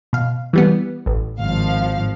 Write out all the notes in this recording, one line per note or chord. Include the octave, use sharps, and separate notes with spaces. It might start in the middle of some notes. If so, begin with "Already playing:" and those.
B2 F5
E3 G3 B3
A1
G#1 F3 F5